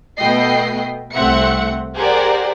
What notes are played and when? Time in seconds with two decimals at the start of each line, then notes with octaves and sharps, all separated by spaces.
0.18 B2 A3 B3 D#5 G5 C7
1.14 C2 A3 C4 E5 F#5 C#7
1.96 G4 G#4 A#4 C5 D5 F#5